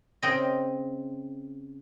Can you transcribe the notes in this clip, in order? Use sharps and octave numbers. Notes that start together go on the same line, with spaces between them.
C#3 C4 D#5